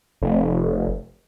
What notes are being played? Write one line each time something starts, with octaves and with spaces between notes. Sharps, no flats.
F1